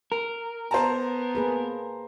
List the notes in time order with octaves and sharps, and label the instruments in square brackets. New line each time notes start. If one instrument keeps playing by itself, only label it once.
[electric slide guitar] A#4
[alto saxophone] B3 [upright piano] C5 A5 A#5
[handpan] A#3 G#4 B4